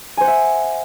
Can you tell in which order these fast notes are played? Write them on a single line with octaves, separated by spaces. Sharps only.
G#5 C5 F#5 E5